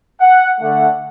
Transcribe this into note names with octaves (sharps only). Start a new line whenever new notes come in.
F#5
D3 A3 F#5